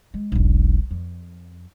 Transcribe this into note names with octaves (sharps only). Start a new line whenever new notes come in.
G#3
E1 B1
F2